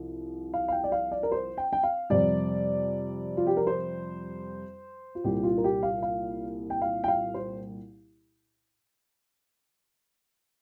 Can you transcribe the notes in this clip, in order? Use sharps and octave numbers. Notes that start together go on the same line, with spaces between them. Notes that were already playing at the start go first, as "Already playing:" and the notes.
Already playing: C2 F3
F5
F5
G5
D5
F5
D5
A#4
C5
G5
G5
F5
F2 C3 G3 D5
F4
G4
A#4
C5
F4
C2 A#2 G3 G4
F4
A#4
G4
F5
F5
G5
F5
G5
F5
C5